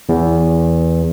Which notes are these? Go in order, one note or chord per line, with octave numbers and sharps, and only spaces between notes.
E2